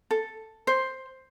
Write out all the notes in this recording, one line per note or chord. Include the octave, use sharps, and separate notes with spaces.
A4
C5